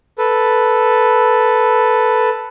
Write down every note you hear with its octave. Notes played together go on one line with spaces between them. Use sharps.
A4 B4